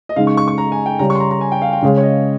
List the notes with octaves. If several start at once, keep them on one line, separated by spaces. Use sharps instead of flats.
D#5
C#3 G#3 D#4 F5
C#6
C#6
C#6
A#5
G#5
G5
C#3 G3 C#4 G4 A#5
C#6
C6
A#5
A#5
G#5
G5
F5
G5
C#3 G#3 C#4 G#4 F5
C#5
D#5